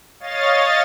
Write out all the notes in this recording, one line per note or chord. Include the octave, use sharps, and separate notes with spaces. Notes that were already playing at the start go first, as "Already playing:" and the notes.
C#5 D#5 F5 A6